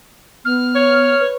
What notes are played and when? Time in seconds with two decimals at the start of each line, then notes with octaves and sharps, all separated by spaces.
0.45 B3 F6
0.75 C#5
1.20 B4